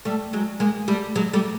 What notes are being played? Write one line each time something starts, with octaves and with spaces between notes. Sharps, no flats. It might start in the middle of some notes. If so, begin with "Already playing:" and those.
G3 A3
F#3 G#3
G#3 A#3
G3 A3
F#3 G#3
G3 A3